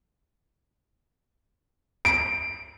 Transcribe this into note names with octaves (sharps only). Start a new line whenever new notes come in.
D7